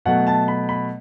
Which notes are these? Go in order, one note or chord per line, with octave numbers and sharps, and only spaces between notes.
B2 F#3 A3 F#5
A5
B5
B5